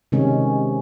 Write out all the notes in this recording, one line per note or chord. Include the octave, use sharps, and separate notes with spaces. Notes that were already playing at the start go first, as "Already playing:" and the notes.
C3 D#3 G#3 C#4